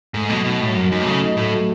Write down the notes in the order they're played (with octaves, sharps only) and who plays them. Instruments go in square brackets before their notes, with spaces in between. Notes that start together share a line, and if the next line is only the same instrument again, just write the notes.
[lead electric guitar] G#2 [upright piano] A3
[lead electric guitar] B2 [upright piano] F#3
[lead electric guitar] B2 [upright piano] D#4
[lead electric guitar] A2 [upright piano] F#3
[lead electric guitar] F#2 [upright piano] F#3
[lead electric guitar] F#2 [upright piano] D#4
[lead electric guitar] C#3 [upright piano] A3
[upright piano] D#4
[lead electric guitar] A2 [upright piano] A3
[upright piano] F#3